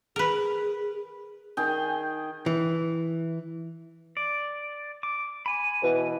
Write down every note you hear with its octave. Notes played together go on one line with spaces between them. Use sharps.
G#4 A#4 B4
D#3 G#4 G5
E3
D5
D6
G#5 B5
B2 E3